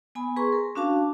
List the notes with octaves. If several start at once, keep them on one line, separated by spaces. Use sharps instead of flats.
B3 G#5 B5
G#4 B4 A#5 C6 C#6
A#4
C#4 D4 F#4 F5 A5 D6